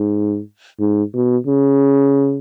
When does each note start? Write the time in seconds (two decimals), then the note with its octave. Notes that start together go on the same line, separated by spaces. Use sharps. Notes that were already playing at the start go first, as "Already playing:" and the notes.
Already playing: G#2
0.80 G#2
1.14 B2
1.47 C#3